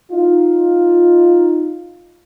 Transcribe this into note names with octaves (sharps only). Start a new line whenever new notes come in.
D#4 F4